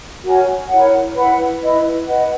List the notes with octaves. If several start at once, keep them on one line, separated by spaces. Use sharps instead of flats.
F#4 A#4 C#5 G#5
E4 A#4 C#5 F#5
E4 B4 F#5 B5
E4 B4 D#5
B4 D#5 F#5